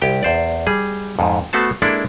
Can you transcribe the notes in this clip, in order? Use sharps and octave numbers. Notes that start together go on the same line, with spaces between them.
C2 G4 G5
E2 C5 D5
G3 G#4
F2 G#2
A3 B3 F#4 C5 A5
G#3 A#3 D4 E4 A4 D5